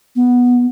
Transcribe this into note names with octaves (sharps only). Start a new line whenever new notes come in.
B3